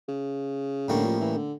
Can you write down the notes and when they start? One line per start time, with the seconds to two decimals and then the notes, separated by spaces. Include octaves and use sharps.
0.08 C#3
0.88 A2 D3 G3 A#3 C#4
1.05 F3
1.21 E3
1.36 D3